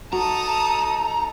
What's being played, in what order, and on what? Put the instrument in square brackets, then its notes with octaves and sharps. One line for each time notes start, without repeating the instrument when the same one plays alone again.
[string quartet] D#4 A4 [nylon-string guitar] F#4 [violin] A5 D#6 [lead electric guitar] A#5